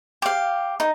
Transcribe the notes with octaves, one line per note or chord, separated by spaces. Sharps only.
G4 F5
D#4